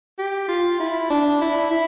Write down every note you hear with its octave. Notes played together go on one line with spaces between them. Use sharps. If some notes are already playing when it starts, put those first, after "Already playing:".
G4
F4
E4
D4
E4
E4